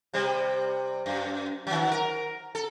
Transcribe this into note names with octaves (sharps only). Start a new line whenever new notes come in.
C3 G3 C5
F#2
D#3 F#3
A#4
A4